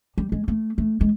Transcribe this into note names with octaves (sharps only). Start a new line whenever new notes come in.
G3
G#3
A3
A3
G#3